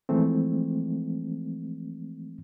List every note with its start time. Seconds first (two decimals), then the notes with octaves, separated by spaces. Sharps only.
0.09 E3 F3 G#3 A3 C4